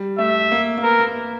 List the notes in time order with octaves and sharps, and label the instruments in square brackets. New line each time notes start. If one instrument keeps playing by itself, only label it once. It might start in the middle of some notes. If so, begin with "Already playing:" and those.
Already playing: [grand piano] G3
[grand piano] A3 [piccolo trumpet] E5
[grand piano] A#3
A#3
[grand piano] B3 [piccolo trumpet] A#4
[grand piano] A#3